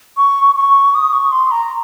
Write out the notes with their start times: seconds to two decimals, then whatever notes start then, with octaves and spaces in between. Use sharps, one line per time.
0.17 C#6
0.56 C#6
0.94 D#6
1.13 C#6
1.32 C6
1.51 A#5